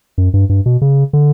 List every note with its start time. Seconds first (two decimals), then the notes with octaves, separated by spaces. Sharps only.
0.18 F#2
0.34 G2
0.49 G2
0.66 B2
0.82 C#3
1.13 D3